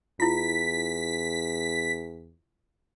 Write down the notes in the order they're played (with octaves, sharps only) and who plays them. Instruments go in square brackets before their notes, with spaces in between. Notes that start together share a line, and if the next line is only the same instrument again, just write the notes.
[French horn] E2 [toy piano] E4 F4 [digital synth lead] B6